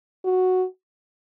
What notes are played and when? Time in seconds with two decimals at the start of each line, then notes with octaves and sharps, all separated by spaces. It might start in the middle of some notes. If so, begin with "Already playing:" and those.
0.25 F#4